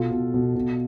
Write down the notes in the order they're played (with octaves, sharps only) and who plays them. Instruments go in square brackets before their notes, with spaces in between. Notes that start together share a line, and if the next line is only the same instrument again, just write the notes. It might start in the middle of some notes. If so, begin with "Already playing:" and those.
Already playing: [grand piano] B2 F4 A4
B2
B2
B2